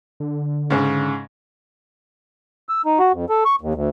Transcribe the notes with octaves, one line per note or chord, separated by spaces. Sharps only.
D3
G#2 C#3
E6
D#4
F#4
F2
A4
C#6
D#2
D2